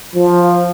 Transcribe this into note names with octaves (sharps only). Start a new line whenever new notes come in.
F3